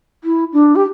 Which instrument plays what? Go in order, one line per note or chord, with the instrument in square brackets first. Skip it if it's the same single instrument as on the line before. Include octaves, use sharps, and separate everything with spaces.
[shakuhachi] E4
D4
G4